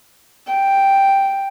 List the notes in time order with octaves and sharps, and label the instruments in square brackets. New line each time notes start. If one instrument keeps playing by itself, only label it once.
[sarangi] G5